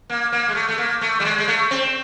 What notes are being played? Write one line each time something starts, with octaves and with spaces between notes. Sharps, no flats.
A#3
A#3
G#3
A3
A3
A#3
A3
G3
G#3
G#3
A3
C4